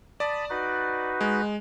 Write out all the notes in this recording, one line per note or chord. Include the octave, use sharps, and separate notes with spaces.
D5 A5 B5 D#6
D#4 F#4 B4
G#3